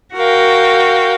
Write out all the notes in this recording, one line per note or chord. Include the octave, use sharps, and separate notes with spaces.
F#4 A#4 F5 G5